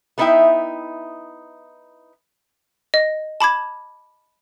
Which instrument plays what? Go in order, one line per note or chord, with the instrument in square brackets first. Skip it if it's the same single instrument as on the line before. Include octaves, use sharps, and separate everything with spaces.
[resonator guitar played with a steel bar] A3 B3 D#4 E4 E5 G5
[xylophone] D#5
A5 B5 D6 G#6